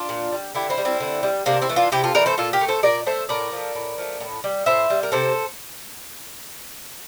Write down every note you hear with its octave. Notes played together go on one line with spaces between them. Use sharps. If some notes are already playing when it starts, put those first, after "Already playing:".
Already playing: D4 F4
A#2
G3
D3 E4 G4
C4 E4
G3
C4 E4
D3
G3
C3 A#3 D4
C4 E4
E3 A3
D4 F4
C3 E4 G4
F4 A4
E3 A3 A#4 D5
A4 C5
A#2 F4 A4
G4 A#4
A3
A4 C5
A#2 A#4 D5
A3 C5 E5
A2 A#4 D5
F3 A3
A2
F3 A3
A2
G3
A2 C5 E5
G3
A#4
C3 A4 C5